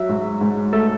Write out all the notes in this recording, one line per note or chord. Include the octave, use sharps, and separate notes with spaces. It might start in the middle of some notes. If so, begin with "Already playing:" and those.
Already playing: F#3 E5
G#2
G#2
A3 A4